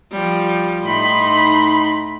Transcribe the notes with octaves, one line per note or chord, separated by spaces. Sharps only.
F3 G3
A2 D#4 B5 C6